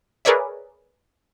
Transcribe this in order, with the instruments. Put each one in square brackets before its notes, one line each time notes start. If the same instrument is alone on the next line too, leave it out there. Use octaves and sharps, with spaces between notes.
[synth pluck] G#4 A#4 B4 C#5 D5 E5